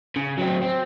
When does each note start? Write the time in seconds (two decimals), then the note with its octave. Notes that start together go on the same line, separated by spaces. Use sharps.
0.16 C#3
0.38 F#3 C4
0.61 C4